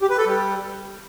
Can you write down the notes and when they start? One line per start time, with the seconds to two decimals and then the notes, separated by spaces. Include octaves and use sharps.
0.02 G4
0.10 B4
0.18 A4
0.26 G3